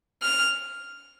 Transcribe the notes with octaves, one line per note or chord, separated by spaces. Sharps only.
F6